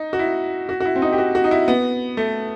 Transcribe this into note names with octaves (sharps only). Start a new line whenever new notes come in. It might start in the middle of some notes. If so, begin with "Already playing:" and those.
Already playing: D#4
F#4
E4
F#4
F#4
E4
C4
D#4
G4
F#4
F#4
D#4
E4
B3
A3